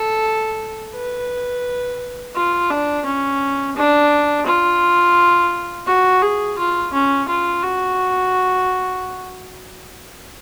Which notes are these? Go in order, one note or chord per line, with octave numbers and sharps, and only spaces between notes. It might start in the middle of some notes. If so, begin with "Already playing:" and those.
Already playing: A4
B4
F4
D4
C#4
D4
F4
F#4
G#4
F4
C#4
F4
F#4